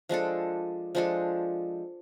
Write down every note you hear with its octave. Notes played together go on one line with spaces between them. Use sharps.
F3 G#3 D4 A4
F3 G#3 D4 A4